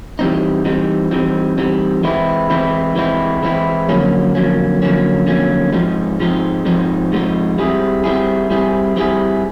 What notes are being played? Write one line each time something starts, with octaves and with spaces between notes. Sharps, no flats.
E3 G3 C4 D#4
E3 G3 C4 D#4
E3 G3 C4 D#4
E3 G3 C4 D#4
E3 G#3 C4 E4
E3 G#3 C4 E4
E3 G#3 C4 E4
E3 G#3 C4 E4
F2 D3 F#3 A#3 C#4
F2 D3 F#3 A#3 C#4
F2 D3 F#3 A#3 C#4
F2 D3 F#3 A#3 C#4
G#2 F3 G#3 C4 D#4
G#2 F3 G#3 C4 D#4
G#2 F3 G#3 C4 D#4
G#2 F3 G#3 C4 D#4
G3 C4 E4 G#4
G3 C4 E4 G#4
G3 C4 E4 G#4
G3 C4 E4 G#4